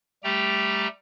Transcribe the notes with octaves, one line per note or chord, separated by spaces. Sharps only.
G3 A3 G4 G5 A#5